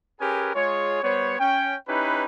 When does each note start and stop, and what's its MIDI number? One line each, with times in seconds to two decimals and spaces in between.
0.20 0.50 61
0.20 0.50 67
0.20 0.50 68
0.20 0.50 70
0.20 0.50 71
0.20 0.50 80
0.55 1.01 56
0.55 1.01 65
0.55 1.01 68
0.55 1.01 73
1.03 1.39 55
1.03 1.39 59
1.03 1.39 72
1.03 1.39 73
1.40 1.75 61
1.40 1.75 79
1.88 2.25 61
1.88 2.25 63
1.88 2.25 64
1.88 2.25 67
1.88 2.25 71